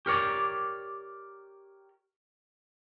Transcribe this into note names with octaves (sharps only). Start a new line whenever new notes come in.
G4 A#4 C#5 D5